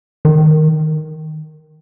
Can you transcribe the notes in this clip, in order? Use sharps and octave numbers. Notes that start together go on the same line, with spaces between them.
D#3